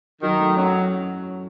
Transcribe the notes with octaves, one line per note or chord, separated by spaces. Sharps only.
D#3 F#3
A3
F#3 C#4